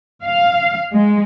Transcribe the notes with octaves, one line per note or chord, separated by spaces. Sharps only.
F5
G#3